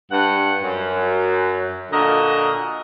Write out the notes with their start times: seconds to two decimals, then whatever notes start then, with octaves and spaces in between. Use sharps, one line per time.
0.11 G2 F#5
0.62 F#2
1.92 A#2 D3 F#4 A#4 D#5